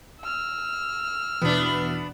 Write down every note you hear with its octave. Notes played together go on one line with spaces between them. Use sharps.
E6 F6
E2 B2 E3 B3 D4